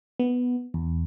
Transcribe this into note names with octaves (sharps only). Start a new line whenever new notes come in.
B3
E2